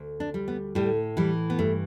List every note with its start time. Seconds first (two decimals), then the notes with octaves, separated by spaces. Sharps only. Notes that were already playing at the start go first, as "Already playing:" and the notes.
Already playing: D2
0.20 D4
0.34 G3
0.48 B3
0.75 A2 G3
1.17 E3 G3
1.50 B3
1.59 G2 A3